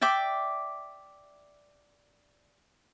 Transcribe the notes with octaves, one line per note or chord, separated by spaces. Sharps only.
D5 E5 G5 D6